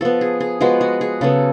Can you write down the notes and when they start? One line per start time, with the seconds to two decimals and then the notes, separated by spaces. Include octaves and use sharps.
0.01 F3 B3 A4
0.21 G#4
0.40 G#4
0.61 F3 G#3 B3 F#4
0.81 F#4
1.01 G#4
1.21 C#3 F#3 B3 A4